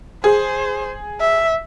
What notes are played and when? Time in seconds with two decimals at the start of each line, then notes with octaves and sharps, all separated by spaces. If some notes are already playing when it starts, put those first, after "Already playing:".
0.24 G#4 C5
1.20 E5